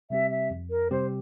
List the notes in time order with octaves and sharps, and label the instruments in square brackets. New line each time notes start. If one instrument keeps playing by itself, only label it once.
[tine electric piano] C3 G3 C4 G4 [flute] E5
[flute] E5
[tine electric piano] F2
[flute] A#4
[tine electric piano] C3 G3 C4 G4 [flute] C5